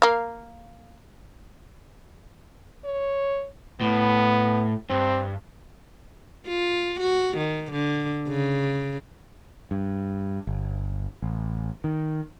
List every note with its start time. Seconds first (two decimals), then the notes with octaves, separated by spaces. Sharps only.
0.02 A#3 F5
2.85 C#5
3.81 A2 B3
4.90 G2 C4
6.48 F4
7.00 F#4
7.37 D#3
7.72 D3
8.28 C#3
9.71 G2
10.47 G1
11.22 A1
11.84 D#3